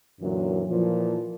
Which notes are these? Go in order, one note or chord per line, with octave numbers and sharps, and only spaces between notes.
F#2 A#2 D3 E3 F#3
A#2 E3 F3